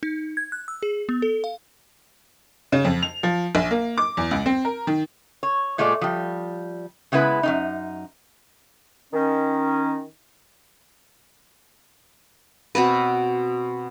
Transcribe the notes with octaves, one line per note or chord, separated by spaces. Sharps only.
D#4
G#6
F#6
E6
G#4
B3
A4
F5
C#3
F2
F7
F3
A#1
A#3
D6
E2
C#2
C4
A#4
D#3
C#5
A#2 G#3 A3 F4 A4 D5
F3 G3
C#3 G#3 B3 E4 B4
F#2 C#3 D#4
D#3 C#4
B2 B3 C4 B4